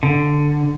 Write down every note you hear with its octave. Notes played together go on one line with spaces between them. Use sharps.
D3